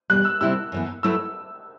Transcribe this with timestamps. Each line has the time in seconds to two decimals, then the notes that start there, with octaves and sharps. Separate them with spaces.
0.10 E2 B2 G3 F#6
0.25 E6
0.41 C3 G3 C4 E4 G4 E6
0.72 F#2 E3 B3
1.03 F#3 A3 E4 B4 E6